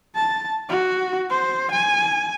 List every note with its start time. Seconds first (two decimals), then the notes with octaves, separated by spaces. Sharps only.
0.15 A5
0.69 F#4
1.30 C5
1.72 G#5